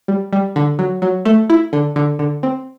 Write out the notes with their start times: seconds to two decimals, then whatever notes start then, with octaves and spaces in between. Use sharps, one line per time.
0.08 G3
0.33 G3
0.56 D3
0.79 F#3
1.02 F#3
1.25 A3
1.50 E4
1.73 D3
1.96 D3
2.19 D3
2.43 C4